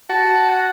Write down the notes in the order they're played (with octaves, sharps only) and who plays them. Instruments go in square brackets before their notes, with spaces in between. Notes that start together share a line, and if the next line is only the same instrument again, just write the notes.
[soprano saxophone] F#4 [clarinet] A5
[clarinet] F#5